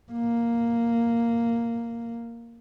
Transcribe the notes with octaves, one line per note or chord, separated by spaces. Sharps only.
A#3